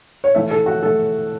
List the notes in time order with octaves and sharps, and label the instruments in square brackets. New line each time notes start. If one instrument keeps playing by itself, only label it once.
[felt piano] C#5
A2 E3 A3 E5
A4
F#4
A2 E3 A3 A4